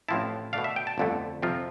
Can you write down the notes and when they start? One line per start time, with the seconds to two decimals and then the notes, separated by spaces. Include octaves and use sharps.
0.08 A1 A2 F3 C4 E4 A5
0.53 B2 A3 D4 F5
0.64 E5
0.76 G5
0.87 A5
0.98 G1 F2 D3 A3
1.42 F2 C3 F3 C4 F4